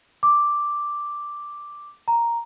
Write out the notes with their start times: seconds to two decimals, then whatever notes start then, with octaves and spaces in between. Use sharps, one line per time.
0.23 D6
2.08 A#5